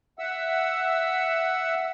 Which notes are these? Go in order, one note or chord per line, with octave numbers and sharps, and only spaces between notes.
E5 F#5 E6